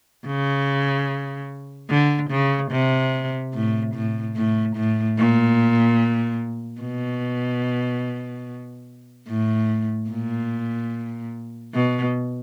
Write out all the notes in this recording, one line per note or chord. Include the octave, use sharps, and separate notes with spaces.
C#3
D3
C#3
C3
A2
A2
A2
A2
A#2
B2
A2
A#2
B2